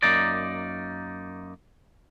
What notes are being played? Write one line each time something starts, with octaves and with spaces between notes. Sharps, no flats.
F#2 A#3 D#4 D5